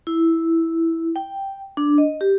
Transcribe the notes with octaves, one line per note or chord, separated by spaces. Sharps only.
E4
G5
D4
D#5
G4